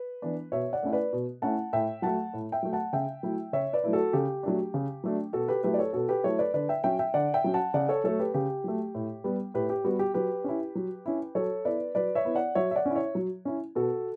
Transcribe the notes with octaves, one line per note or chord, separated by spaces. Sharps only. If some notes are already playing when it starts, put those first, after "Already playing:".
Already playing: B4
E3 B3 D4
B2 C#5 E5
D5 F#5
A3 C#4 E4
B4 D5
B2
A3 C#4 E4 F#5 A5
A2 E5 G5
F#3 A3 F#5 A5
A2
E5 G5
F#3 A3
F#5 A5
C#3 E5 G5
F#3 A3 E4
C#3 C#5 E5
B4 D5
F#3 A3 E4
F#4 A4
C#3 G4
F#3 A3 D4
C#3
F#3 A3 D4
B2 F#4 A4
G4 B4
F#3 A3 E4 G4 B4
D5
A4 C#5
B2 F#4 A4
G4 B4
F#3 A3 E4 A4 C#5
B4 D5
D3 B4 D5
E5 G5
F#3 C#4 E5 G5
E5 G5
D3 D5 F#5
E5 G5
F#3 C#4
F#5 A5
C#3 D5 F#5
A4 C#5
F#3 A3 A4 C#5
G4 B4
C#3 G4
F#3 A3
A2
G3 B3
A2 G4 B4
G4
G3 B3 F#4
G4
F#3 G4 B4
C#4 E4
F#3
C#4 E4
F#3 A4 C#5
B3 E4 B4 D5
F#3 B4 D5
C#5 E5
B3 E4
D5 F#5
F#3 C#5 E5
E5
D5 F#5
C#4 E4
C#5 E5
F#3
C#4 E4
B2 F#4 A4